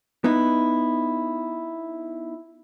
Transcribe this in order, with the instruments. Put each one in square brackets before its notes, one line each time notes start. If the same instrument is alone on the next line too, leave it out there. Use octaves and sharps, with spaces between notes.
[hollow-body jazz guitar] B3 D#4 E4